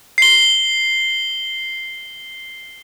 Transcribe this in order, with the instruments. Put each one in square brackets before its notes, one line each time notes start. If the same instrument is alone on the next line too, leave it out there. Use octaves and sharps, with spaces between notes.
[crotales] C7 G7